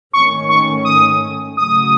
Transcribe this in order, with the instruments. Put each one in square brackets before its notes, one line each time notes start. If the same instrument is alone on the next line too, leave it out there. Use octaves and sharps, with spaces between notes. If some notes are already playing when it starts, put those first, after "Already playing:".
[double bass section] G#2 D#3 A3 C#4 [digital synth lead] C#6
[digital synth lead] C#6
D#6
[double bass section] C#3 F#3 A3 [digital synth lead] D#6